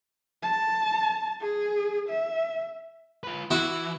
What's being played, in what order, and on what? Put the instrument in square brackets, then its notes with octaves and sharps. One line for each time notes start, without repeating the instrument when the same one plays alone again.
[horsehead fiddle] A5
G#4
E5
[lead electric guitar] F4 B4
[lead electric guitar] E3 [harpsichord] E4 F#4